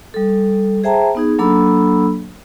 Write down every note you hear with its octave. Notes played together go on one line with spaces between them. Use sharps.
G3 A4
G#4 C5 E5 G5 A5 A#5
B3 D#4 G#4
F#3 A#3 D4 A4 B5 E6